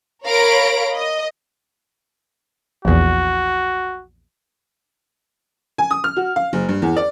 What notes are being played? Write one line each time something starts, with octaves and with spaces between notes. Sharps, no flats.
A#4 C#5 F5 B5 A#6 D7
D#5
A#1 E2 F#4
G#5
D#6
F6
F#4
F5
F#1
G2
E2
D5